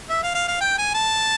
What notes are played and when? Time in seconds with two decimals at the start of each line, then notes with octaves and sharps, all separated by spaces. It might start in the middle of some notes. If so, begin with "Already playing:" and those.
0.10 E5
0.23 F5
0.35 F5
0.48 F5
0.61 G5
0.79 G#5
0.94 A5